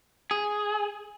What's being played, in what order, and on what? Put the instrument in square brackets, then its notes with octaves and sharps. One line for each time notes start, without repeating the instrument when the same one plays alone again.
[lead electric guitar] G#4